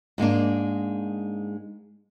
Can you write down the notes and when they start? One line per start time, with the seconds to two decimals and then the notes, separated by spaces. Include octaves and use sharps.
0.18 G#2 G#3 A#3 D4